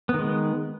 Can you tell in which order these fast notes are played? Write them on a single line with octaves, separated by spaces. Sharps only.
B3 D#3 G#3